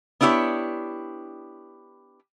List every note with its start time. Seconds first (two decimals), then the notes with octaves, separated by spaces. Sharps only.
0.21 B3 D4 E4 G4 C#5